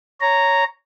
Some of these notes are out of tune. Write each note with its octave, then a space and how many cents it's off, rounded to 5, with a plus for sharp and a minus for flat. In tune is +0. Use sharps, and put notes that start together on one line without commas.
C#5 +5 A#5 -5